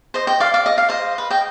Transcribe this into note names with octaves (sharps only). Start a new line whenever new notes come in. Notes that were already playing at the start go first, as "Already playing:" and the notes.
C5 D#5
D#5 G5
D5 F5
D5 F5
D#5
F5
C5 D#5
B4
D#5 G5